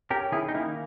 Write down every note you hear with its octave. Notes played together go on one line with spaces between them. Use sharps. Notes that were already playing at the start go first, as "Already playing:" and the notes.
C#4 G4 A#4
D#3 E4 G#4
D#4
A#3 E4